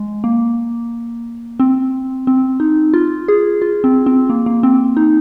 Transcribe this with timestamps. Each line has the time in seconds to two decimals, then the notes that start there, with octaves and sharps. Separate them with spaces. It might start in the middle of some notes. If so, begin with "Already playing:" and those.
Already playing: G#3
0.24 A#3
1.60 C4
2.27 C4
2.60 D#4
2.94 F4
3.28 G#4
3.62 F4
3.84 C4
4.06 C4
4.29 A#3
4.46 A#3
4.63 C4
4.97 D#4